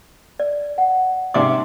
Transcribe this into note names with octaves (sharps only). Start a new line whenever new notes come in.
D5
F#5
G#2 C3 D5 D6